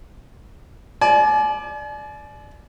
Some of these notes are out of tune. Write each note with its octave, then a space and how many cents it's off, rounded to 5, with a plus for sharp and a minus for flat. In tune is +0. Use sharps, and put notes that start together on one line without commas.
D5 +10 G#5 +45